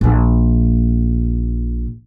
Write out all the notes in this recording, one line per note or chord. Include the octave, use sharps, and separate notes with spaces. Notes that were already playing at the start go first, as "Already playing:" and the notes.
A#1 A#2